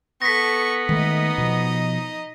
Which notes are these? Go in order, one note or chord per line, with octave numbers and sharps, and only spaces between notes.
B3 A4 C#6 A#6 B6
D#3 G#3 A3 D#4 D#5
B2 F3